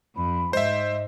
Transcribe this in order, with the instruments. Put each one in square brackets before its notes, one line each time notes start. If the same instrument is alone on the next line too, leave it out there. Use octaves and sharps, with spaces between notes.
[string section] F2 [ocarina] B5
[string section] G#2 [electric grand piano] C5 E5 [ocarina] D#5